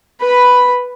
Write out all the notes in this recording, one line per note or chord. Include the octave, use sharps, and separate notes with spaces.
B4 B5